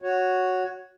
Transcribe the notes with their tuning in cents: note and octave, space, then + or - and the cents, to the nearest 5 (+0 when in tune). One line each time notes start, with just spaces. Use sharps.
F#4 -5 C#5 +0